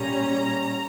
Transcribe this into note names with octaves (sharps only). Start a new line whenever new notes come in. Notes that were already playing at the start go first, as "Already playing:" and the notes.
Already playing: A#2 G3 C#4 A#5